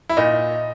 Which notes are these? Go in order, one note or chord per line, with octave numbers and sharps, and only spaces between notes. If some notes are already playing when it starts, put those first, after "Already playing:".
E4
A#2 D#4